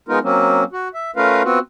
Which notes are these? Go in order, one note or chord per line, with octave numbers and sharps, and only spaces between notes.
G#3 B3 D#4 F4 A#4
F#3 A#3 C4 C#4
F#4
E5
A3 C#4 F4 A#4 B4 F5
B3 C4 F4 F#4